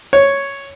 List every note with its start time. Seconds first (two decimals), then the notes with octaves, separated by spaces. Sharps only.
0.13 C#5